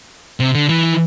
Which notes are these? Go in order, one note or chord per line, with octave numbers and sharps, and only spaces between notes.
C3
D3
E3